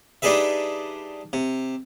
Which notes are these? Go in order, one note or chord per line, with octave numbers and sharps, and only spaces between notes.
G3 D4 D#4 G#4 B4 E5
C3